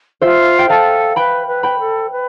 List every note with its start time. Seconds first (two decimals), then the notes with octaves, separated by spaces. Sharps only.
0.21 F4 C5 E5
0.59 G5
0.69 A4 F5 A5
1.16 B4 G5 B5
1.47 B4
1.63 G5 B5
1.79 A4
2.11 B4